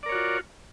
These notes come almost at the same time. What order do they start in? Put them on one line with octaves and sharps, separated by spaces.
D5 A#4 C#5 F#4 F4